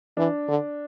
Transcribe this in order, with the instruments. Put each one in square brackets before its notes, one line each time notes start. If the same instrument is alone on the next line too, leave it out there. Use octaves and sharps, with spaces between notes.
[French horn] E3 [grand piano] D4
[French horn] D3